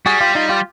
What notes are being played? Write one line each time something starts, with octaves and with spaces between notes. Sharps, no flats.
G3 F#4 G#4
F4 G4
D#4 F4
F4 G4